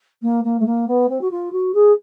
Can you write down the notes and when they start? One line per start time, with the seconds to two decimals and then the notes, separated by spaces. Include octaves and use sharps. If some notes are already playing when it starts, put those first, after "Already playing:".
0.22 A#3
0.44 A#3
0.59 A3
0.66 A#3
0.87 B3
1.09 C4
1.21 F#4
1.31 F4
1.52 F#4
1.74 G#4